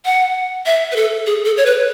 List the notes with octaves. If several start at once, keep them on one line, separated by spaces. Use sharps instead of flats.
F#5
E5
B4
A4
G#4
A4
C#5
B4